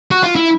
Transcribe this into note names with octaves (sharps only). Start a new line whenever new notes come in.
F#4
F4
E4